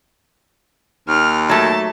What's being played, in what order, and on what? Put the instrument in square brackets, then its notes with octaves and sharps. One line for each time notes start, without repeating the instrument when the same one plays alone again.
[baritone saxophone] D#2 [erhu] F6
[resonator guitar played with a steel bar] F#3 A3 [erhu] A5